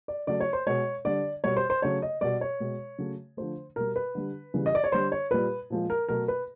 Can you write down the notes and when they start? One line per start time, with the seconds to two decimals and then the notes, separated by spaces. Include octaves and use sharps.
0.08 D5
0.27 C#3 F#3 A3 D5
0.40 C#5
0.53 C5
0.67 B2 G#3 C#5
1.05 D3 G3 D5
1.44 B2 G3 C#5
1.57 C5
1.70 C5
1.82 C#3 F#3 A3 C#5
2.02 D#5
2.21 B2 G3 D5
2.41 C#5
2.60 B2 G#3
2.99 C#3 F#3 A3
3.37 D3 F3 A3 C5
3.76 B2 G3 A#4
3.96 B4
4.15 D3 G3
4.54 C#3 E3 G3
4.66 D#5
4.75 D5
4.84 C#5
4.92 D3 G3 C5
5.12 C#5
5.31 A#2 G3 B4
5.70 A#2 F3 G#3
5.90 A#4
6.09 B2 F#3 A3 A#4
6.28 B4